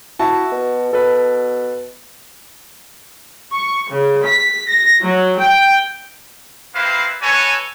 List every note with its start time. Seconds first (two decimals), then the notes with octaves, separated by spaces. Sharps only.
0.19 E4 F#4 A5
0.52 B2
0.93 B2 A4 B4
3.53 C#6
3.91 C#3
4.26 B6
4.70 A#6
5.03 F#3
5.40 G5
6.75 A#3 C4 E4 B4 C5 F5
7.22 F#4 A4 B4 C#5 G#5